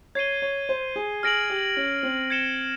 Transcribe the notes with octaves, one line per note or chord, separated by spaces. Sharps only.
C#5 G#6 C7 D#7 G7
C#5
C5
G#4
G#4 F6 A#6 D7 F#7
G4
C#4
C4
G#6 C#7 E7 G7